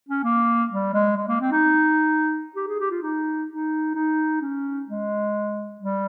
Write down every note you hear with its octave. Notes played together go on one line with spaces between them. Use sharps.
C#4
A#3
G3
G#3
G#3
A#3
C4
D#4
G4
G#4
G4
F4
D#4
D#4
D#4
C#4
G#3
G3